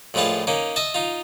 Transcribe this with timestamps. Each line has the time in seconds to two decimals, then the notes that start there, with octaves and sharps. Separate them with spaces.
0.14 A#1 A2 G#3 A3 F4 A5
0.47 A#3 C#4 D#4
0.76 D#5 E5 A5
0.94 D#4 F4